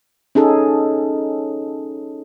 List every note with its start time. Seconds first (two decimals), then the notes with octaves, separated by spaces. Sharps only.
0.35 C#4 D#4 G#4 A4